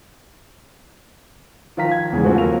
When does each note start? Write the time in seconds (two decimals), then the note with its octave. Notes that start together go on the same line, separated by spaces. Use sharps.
1.77 D#3 F3 F5 A#5 B6
1.91 G#6
2.12 E2 G#2 C#3 E3
2.24 F3 A3 C4 F#4
2.38 D#2 A#4 F7